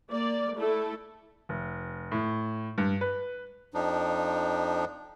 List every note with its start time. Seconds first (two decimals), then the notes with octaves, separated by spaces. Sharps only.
0.11 A#3 D5
0.57 A3 E4 A4
1.49 F1
2.12 A2
2.78 G2
3.01 B4
3.74 F2 F3 D4 D#4